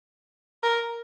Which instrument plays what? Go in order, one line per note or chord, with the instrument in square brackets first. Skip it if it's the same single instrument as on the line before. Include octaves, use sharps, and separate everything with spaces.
[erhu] A#4